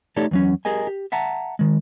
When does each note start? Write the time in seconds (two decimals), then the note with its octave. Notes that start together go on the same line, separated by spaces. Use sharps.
0.17 A3 D#4 G4 A4 C#5 D5
0.31 E2 F#3 C#4
0.65 G4 G#4 A#4 D#5 G#5
0.87 G4
1.12 E5 F#5 A5 A#5
1.59 D#3 G#3